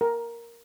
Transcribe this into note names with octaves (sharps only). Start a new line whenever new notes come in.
A#4